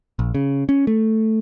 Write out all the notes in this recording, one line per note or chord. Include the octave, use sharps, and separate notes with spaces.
A#1
C#3
C#4
A3